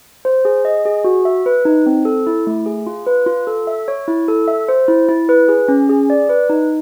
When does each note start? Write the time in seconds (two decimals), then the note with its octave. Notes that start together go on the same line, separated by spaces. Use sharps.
0.25 C5
0.45 G#4
0.65 D#5
0.85 G#4
1.04 F#4
1.25 E5
1.46 B4
1.65 D#4
1.86 C4
2.05 A4
2.27 E4
2.47 A3
2.66 G#4
2.87 F4
3.06 B4
3.26 F4
3.47 A4
3.67 E5
3.88 C#5
4.08 E4
4.28 A4
4.48 E5
4.68 C5
4.88 E4
5.09 E4
5.29 B4
5.49 G#4
5.68 C#4
5.89 G#4
6.10 D5
6.29 B4
6.50 D#4